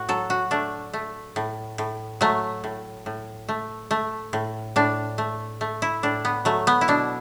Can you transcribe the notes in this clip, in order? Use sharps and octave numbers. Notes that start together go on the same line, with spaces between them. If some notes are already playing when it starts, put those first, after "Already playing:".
Already playing: A2 F#4
F#3 A4
F#4
A3 D4
A3
A2
A2
F#3 A3
A2
A2
A3
A3
A2
A2 D4
A3
A3
E4
A2 D4
B3
F#3 A3
B3
E4
B2 D4